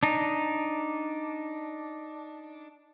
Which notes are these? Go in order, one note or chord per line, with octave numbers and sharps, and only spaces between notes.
D4 D#4